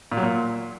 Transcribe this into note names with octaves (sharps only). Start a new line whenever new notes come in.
A#2
F#3
A#2